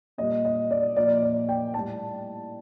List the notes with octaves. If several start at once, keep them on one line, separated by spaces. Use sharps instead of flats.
A#2 G3 D#5
D#5
D5
A#2 F3 D5
D5
G5
A2 G3 A5